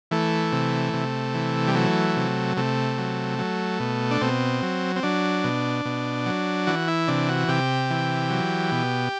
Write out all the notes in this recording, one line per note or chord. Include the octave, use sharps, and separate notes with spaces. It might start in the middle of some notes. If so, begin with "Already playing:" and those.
E3 A3
C3
C3
E3
G3
F#3 A3
C3
C3 A3
F#3
F#3
B2
D4
B2 C4
F#3
C4
F#3 D4
B2
B2
F#3
E3 F#4
E4
C3 D4
F#4
C3 G4
E3
F#3
B2